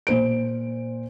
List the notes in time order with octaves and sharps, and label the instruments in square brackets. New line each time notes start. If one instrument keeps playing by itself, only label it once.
[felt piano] A#2 C5 D7